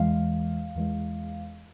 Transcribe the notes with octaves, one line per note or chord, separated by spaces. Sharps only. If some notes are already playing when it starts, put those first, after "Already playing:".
Already playing: E2 E3 G#3 F5
E2 E3 G#3